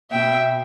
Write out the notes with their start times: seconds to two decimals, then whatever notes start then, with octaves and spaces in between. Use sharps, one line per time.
0.11 B2 E5 G5